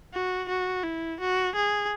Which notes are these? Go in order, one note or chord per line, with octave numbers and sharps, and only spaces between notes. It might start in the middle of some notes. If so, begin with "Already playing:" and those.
F#4
F#4
E4
F#4
G#4